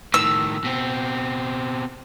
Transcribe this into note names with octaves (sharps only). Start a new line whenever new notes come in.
A2 D#3 E6
B2 C4